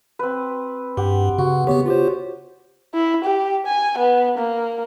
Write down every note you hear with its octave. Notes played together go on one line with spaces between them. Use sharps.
C4 B4
G2 G4 F#5
C#3 F#4
C#3 B3 G4 C#5
F4 G4 C5
E4
G4
G#5
B3
A#3